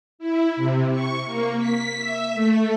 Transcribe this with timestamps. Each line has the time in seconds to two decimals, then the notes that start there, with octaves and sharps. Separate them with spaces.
0.19 E4
0.56 C3
0.91 C#6
1.25 A#3
1.58 B6
1.99 E5
2.34 A3